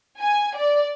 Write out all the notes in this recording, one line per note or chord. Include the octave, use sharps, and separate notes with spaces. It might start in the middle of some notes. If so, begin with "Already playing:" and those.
G#5
D5